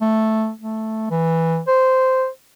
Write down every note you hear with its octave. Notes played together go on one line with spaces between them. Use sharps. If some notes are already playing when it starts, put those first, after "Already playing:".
A3
A3
E3
C5